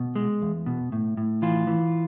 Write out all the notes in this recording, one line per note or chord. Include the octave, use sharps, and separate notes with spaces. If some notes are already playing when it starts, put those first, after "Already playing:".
Already playing: B2
G#3
E2
B2
A2
A2
E3 F4
E3